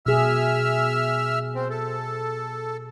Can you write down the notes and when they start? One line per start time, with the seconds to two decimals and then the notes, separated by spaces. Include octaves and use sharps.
0.06 B2 G#4 E5 E6 F6
1.55 C4
1.70 A4